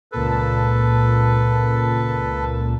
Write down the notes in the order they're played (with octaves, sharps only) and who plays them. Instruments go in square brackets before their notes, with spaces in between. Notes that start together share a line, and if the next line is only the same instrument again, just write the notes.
[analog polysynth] C#2 A#2 A5 [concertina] A4 B4